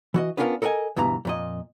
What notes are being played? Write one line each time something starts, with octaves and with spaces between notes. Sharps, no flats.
E3 F#4 D#5
B3 C#4 D4 F4 F#4 A#4
A4 A#4 D#5 F#5 G#5
D2 G2 B2 E3 A#5
F2 A#2 D#5